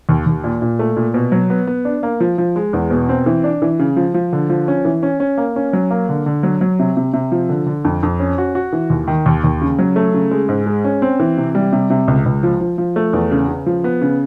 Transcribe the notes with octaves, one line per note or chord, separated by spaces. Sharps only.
D#2
D#2
A#2
A#2
A3
A#2
B2
F#3
B3
B3
D4
A#3
F3
F3
G#3
E2
B2
C4
E3
D4
E3
C#3
F3
F3
D3
F3
C#4
E3
C#4
C#4
A#3
C#4
F#3
A#3
D3
D3
F#3
F#3
C3
C3
C3
F3
D3
D3
F2
F2
C#4
F#4
F#4
E3
D#2
D#3
D#2
D#2
C#3
F#3
A3
C#3
G#3
G#2
G#3
C#4
C4
E3
C3
G3
C3
C3
C#2
C#2
F3
F3
F3
A3
E2
C#3
C#3
F3
B3
C#3